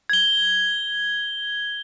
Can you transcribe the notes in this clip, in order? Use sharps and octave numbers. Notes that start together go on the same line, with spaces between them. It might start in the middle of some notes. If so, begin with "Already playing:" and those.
G#6 G7